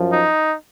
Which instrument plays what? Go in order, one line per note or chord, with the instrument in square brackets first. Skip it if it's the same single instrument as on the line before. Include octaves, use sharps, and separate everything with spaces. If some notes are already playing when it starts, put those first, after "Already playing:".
Already playing: [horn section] F#2 F3
D#4